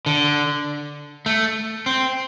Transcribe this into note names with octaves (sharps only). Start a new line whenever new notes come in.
D3
A3
C4